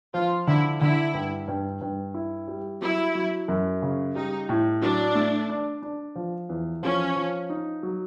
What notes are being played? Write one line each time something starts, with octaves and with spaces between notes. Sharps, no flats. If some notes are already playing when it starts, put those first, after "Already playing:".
F3 F4
D3 E4
D3 E4
G2
G2
G2
E4
G3
F#3 E4
F#3
F#2
C#3
G3 D#4
A2
F#3 D4
A3
D4
D4
F3
E2
F3 C#4
F3
D#4
F#3